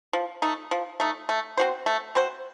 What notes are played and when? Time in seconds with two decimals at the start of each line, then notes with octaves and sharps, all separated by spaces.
0.13 F3
0.42 A3 D#4
0.71 F3
1.00 A3 D#4
1.29 A3
1.57 C4 F#4 C5
1.86 A3
2.15 C4 F#4 C5